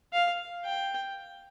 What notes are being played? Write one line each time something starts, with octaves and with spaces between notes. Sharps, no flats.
F5
G5